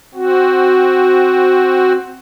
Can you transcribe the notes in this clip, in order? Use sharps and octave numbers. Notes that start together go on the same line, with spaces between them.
C4 F#4